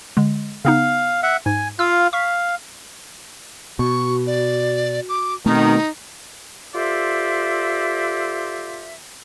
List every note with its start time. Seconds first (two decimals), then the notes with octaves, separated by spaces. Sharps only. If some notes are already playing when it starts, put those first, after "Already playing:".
0.17 D3 G#3
0.65 C#3 B3 D#4 F5
1.23 E5 F#5
1.46 G#2 G#5
1.79 F4 F5 E6
2.13 F5 C#6 B6
3.79 B2 F#4 C#6
4.27 D5
5.09 D6
5.46 B2 D#3 A3 C4 D#4
6.75 F4 G4 A4 C5 D5 E5